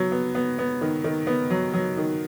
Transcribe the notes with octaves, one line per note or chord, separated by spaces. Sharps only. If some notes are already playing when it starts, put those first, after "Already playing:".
Already playing: F#3 B3
B3
B3
B3
D#3
D#3
B3
F#3
F#3
D#3